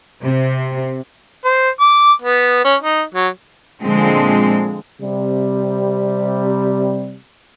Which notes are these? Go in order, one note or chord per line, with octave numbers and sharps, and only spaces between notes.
C3
C5
D6
B3
C#4
D#4
F#3
A#2 D3 F3 G#3 C4
C3 G3